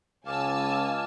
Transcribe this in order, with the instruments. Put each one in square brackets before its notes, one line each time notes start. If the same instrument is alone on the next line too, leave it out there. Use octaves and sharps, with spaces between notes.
[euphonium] C#2 [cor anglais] F5 [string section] G#5 A5 E6 [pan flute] D6